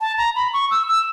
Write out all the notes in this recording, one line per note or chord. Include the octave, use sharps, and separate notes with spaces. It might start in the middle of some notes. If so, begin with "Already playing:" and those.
A5
A#5
B5
C#6
E6
E6